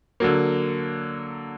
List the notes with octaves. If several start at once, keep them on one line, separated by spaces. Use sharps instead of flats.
D3 F#3 A#3